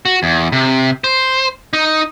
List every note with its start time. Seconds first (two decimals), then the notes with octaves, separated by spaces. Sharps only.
0.05 F#4
0.23 E2
0.52 C3
1.04 C5
1.73 D#4